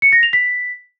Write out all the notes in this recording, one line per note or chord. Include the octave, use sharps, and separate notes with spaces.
C#7
A#6
F7
B6